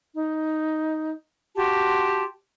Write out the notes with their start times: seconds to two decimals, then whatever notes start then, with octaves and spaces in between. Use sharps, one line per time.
0.13 D#4
1.56 F#4 G4 A5 C6